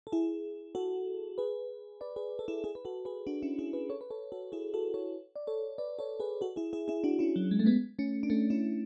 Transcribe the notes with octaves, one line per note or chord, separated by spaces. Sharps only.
A4
E4 G#4
F#4 A4
G#4 B4
B4 D5
G#4 B4
A4
E4 G#4
E4 G#4
B4
F#4 A4
G#4 B4
D4 F#4
C#4 E4
E4 G#4
G#4 B4
A4 C#5
B4
A4 C#5
F#4 A4
E4 G#4
F#4 A4
A4 C#5
D5
A4 C#5
B4 D5
A4 C#5
G#4 B4
F#4 A4
E4 G#4
E4 G#4
E4 G#4
D4 F#4
C#4 E4
F#3
G#3
A3
G#3 B3
A3 C#4
D4
A3 C#4
C#4 E4